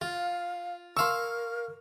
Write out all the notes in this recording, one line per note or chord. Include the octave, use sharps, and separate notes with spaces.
F4 F5
A#4 F5 C6 C#6 E6